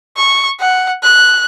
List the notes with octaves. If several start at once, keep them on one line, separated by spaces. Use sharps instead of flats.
C#6
F#5
F#6